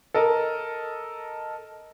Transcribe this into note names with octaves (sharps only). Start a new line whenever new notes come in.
A4 A#4 D#5